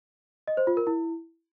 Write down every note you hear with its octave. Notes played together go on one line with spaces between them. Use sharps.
D#5
C5
F4
A#4
E4